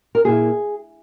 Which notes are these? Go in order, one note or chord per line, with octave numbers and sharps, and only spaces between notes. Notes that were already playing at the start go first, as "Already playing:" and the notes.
A#4
A#2 A#3 E4 G#4